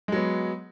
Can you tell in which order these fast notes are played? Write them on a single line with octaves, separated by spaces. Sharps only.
G#3 F#3 B3